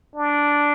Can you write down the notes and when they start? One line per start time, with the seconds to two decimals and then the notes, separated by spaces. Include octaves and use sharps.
0.16 D4